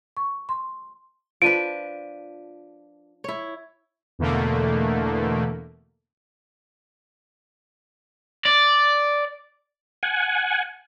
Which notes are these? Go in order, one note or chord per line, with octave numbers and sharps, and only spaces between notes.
C#6
C6
F3 D4 B4 D7 D#7
E4 C#5
E2 B2 D3 A3 A#3
D5
F#5 G#5